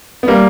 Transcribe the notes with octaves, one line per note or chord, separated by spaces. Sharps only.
B3
G3 A#3